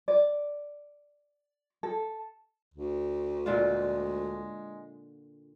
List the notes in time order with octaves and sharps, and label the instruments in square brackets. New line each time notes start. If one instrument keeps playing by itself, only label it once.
[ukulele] D5
A4
[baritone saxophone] D2
[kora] A#2 D3 F4 [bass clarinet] G#3